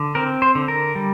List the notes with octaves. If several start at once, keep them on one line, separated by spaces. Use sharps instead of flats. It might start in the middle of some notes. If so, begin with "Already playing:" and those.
Already playing: D3
C4 A#4
C5
D3
A#4
G3